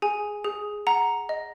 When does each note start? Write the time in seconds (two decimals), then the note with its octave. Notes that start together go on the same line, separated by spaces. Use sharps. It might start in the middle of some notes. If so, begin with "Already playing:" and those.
0.02 G#4 G#5
0.44 G#4
0.87 F#5 A#5
1.29 D#5